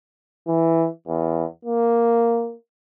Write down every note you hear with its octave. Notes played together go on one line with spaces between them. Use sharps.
E3
E2
A#3